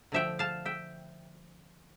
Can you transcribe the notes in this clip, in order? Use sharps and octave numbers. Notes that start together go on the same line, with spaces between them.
D3 F3 A3 E5 G5
F5 A5
E5 G5